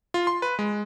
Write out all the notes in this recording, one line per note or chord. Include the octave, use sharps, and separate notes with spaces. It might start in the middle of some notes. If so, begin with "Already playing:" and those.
F4
C6
B4
G#3